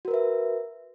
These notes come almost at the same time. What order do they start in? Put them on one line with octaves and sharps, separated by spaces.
F#4 A#4 B4 E5